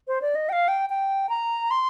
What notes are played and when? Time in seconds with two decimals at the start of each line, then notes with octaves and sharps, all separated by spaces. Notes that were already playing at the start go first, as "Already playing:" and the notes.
0.08 C5
0.22 D5
0.35 D#5
0.49 G5
0.53 F5
0.68 G5
0.90 G5
1.29 A#5
1.71 C6